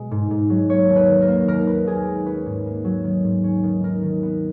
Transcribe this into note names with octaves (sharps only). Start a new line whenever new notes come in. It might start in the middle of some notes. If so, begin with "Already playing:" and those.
Already playing: B2 G#3
G#2
G#2
F#3
A#3 C#5
D#2
B4
D#3
A#4
A#3
D#2 A#4
D#2 B4
D#2 G#4
G#3
C#4 B4
G#2
A#3
F#3
D#3
G#2
C#4
D#3
D#3 A#4
D#3
B3